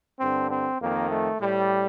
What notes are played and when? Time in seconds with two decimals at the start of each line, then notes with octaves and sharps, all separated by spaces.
0.19 G2 D3 C4
0.50 C4
0.80 F2 D#3 A#3
1.10 A3
1.40 A2 G3